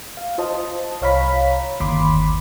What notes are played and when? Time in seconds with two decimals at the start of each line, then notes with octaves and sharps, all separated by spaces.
0.17 F5
0.38 F4 C5 D#5 A5
1.02 C2 C#5 F5 A#5 B5 B6
1.80 G1 D#2 B5 C6 D6